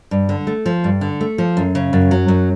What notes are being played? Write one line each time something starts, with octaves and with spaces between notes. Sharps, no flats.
G2
D3
A3
F3
G2
D3
A3
F3
F#2
C#3
F#2
F#3
F#2